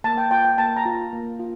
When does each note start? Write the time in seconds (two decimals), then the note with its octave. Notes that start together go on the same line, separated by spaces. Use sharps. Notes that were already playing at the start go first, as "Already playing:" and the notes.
0.04 A#3 A5
0.18 G5
0.31 F4 G5
0.45 G5
0.58 A#3 A5
0.76 A#5
0.85 F4
1.13 A#3
1.40 F4